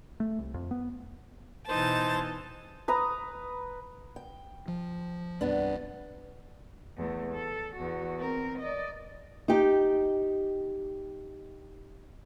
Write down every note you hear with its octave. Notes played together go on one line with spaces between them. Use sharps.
A3
C2
F2
B3
B2 E3 D#4 C5 A5
B4 A#5 D#6
G5
F3
C2 G2 B3 D4
E2 A3
A4
E2 F#4
C4 A#4
D5 D#5
D#4 G4